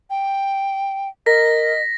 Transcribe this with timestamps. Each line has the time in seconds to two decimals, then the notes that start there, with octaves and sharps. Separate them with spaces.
0.10 G5
1.26 A#4 D#5 A#6 B6